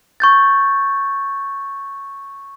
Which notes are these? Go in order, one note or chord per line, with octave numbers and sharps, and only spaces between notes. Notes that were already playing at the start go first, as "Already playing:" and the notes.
C#6 G6 A6